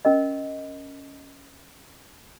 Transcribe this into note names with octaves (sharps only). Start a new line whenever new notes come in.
C#4 A#4 D#5